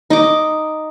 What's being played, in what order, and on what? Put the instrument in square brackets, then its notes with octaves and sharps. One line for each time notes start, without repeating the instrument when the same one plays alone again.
[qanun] D#4 D6